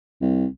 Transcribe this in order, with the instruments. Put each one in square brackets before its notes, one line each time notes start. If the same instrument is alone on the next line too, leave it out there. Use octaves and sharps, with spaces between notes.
[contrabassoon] C2